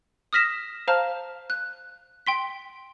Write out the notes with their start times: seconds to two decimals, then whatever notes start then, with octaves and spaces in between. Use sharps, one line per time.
0.33 D#6 F6 A#6 B6 E7
0.88 C5 F5 A5 A#5 F6
1.50 F#6
2.26 G5 C6 B6